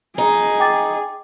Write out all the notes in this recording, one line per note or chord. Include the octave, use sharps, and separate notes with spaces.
D#4 G#4
G5 D6 A6